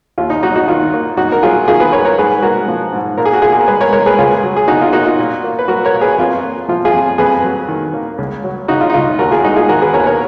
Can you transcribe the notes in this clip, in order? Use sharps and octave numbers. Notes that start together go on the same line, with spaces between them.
D#2 F4
D#4
F#3 D#4 F#4
D#4 F#4
D#3 F4
A#3
F#2 D#4 F#4
A#4
F#3 F4 G#4
D#3 F4 G#4
G#4 B4
F#2 A#4 C#5
A#4 C#5
G#2 G#4 B4
G#3 F#4 A#4
F3
G#2
A#2 A#4
G#4
F#4
A#2 F4 G#4
G#4
A#4
G#3 G#4 B4
A#4 C#5
G#3 A#4 C#5
G#4 B4
C#2 F4 G#4
F#3
G#4
C#3 D#4 F#4
F4
A#3 D#4 F#4
F4
A#2
A#3
B4
F#3 F#4 A#4
A#4 C#5
A#2
G#4 B4
F2 F4
A#3
F3 F4
F4 G#4
F2
F2 G#4 B4
F#3
D#3
A#3
C#2
F#3
C#3 D#4 F#4
F4
D#4
C#2 F4
D#2 F#4 A#4
F4 G#4
G#3 D#4 F#4
F4 G#4
D#3 F#4 A#4
G#4 B4
D#2 A#4 C#5
A#4 C#5